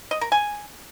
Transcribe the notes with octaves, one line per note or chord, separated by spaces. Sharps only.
D#5
A#4
G#5